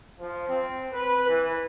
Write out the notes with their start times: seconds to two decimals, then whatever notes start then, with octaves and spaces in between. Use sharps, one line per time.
0.20 F3
0.49 C4
0.93 B4
1.28 E3